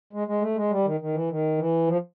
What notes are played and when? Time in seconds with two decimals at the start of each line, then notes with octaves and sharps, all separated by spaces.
0.13 G#3
0.28 G#3
0.41 A3
0.56 G#3
0.71 G3
0.85 D#3
1.00 D#3
1.14 E3
1.29 D#3
1.58 E3
1.87 F3